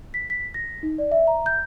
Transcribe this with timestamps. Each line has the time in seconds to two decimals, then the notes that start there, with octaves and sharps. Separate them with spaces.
0.14 B6
0.30 B6
0.54 A#6
0.83 D#4
0.98 D5
1.11 E5
1.27 A#5
1.46 G6